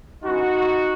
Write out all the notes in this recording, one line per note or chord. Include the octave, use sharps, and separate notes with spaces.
C#3 E3 G#3 D#4 F#4